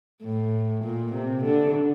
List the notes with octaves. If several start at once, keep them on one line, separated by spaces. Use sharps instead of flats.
A2
A#2
C3
D3